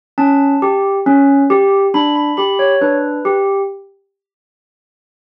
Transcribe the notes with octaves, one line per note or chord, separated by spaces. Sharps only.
C#4 A5
G4
C#4
G4
D4 B5
B5
G4 B5
C#5
D4 B4
G4